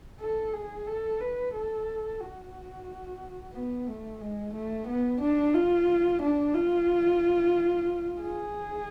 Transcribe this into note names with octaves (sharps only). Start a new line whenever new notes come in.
A4
G#4
A4
B4
A4
F#4
B3
A3
G#3
A3
B3
D4
F4
D4
F4
G#4